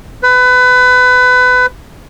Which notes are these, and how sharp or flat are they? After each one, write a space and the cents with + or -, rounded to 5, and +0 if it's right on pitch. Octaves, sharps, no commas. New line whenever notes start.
B4 +25